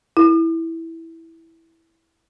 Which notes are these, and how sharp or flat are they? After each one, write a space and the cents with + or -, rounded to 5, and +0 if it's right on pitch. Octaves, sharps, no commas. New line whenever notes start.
E4 -5